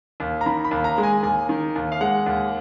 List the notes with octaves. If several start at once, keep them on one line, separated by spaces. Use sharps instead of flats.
D#2
A#5
D#3 B5
B5
D#2
A#5
G#3
G#5
D#2 G#5
D#3
D#2
F5
G#3 F#5
D#2